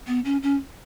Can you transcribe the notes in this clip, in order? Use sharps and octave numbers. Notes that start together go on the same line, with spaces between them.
B3
C#4
C#4